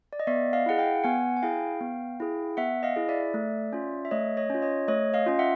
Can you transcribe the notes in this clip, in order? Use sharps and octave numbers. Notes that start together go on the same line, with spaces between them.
D5
D#5
B3 D5 E5
D#5 F5
E4 G#4 F#5
F5 G5
B3 F#5 G#5
G#5
E4 G#4 F5 G5
B3
E4 G#4
B3 E5 F#5
D#5 F5
E4 G#4
D5 E5
A3
C#4 F4
E5
A3 C#5 D#5
C#5 D#5
C#4 F4
C#5 D#5
A3 C#5 D#5
D#5 F5
C#4 F4 F5
E5 F#5